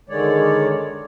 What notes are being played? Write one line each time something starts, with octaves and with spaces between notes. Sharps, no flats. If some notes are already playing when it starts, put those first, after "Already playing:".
D3 D#3 G#3 C#5 D5